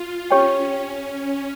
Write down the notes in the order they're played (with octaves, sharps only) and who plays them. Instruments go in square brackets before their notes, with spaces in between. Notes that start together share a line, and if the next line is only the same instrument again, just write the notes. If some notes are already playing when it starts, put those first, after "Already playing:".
Already playing: [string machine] F4
[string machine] C#4 [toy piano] G4 C#5 G5